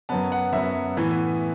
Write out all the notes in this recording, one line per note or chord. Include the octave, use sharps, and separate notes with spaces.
F#2 F#3 B3 A5
F#5
F#2 F#3 B3 E5
A2 E3 B3